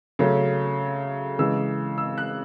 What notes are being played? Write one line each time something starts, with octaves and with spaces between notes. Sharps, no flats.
C#3 F#3 A3 C#4
C#3 E3 G#3 E6
E6
F#6